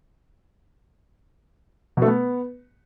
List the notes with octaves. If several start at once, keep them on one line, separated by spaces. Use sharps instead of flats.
B2
A3
B3